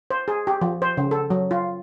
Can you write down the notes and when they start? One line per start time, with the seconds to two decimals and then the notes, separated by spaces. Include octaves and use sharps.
0.11 C5
0.28 G#4
0.47 G4
0.61 F3
0.82 C5
0.97 C#3
1.11 A4
1.30 F#3
1.51 F4